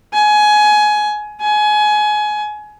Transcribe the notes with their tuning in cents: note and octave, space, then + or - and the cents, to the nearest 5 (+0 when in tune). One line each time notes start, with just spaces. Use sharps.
G#5 +20
G#5 +25